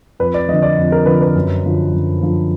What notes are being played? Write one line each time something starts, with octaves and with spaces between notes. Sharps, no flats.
F2 B4
D5
D3 F3 D#5
D5
F2
A#4
D3 F3 B4
B4
F#2
D3 F3
F#2
D3 F3